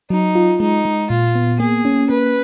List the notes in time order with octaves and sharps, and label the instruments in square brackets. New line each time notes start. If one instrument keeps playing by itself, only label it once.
[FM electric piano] F#3 [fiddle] D#4
[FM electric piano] F4
[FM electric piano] G#3 [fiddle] D#4
[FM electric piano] G#3
[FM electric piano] A#2 [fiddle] F4
[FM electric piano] B3
[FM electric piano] A#3 [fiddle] G#4
[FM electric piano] C#4
[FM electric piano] A#3 [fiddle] B4